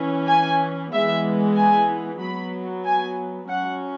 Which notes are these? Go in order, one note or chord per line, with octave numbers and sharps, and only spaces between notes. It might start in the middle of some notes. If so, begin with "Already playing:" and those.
Already playing: E3 C#4
G#5
E3 G#3 B3 E5
G#5
F#3 B3 B5
G#5
F#3 C#4 F#5